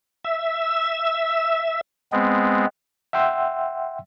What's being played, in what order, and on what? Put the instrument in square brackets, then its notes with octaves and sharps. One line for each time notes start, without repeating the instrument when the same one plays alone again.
[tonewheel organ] E5
[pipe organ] G#3 B3 C4
[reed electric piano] E5 F#5 G5 C6 E6